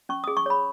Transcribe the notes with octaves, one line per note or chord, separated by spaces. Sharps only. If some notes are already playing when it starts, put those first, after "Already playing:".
C#4 C#6
G#4 D#6
C#6
C#5 B5